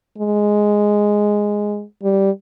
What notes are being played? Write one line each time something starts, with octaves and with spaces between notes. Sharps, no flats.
G#3
G3